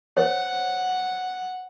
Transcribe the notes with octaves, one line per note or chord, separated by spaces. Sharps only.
C5 C#5 F#5